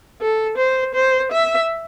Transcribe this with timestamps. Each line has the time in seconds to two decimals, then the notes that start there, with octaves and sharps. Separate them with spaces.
0.21 A4
0.58 C5
0.95 C5
1.32 E5